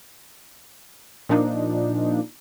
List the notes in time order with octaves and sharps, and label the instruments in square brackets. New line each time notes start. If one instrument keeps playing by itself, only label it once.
[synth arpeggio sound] A#2 F3 D4 D#4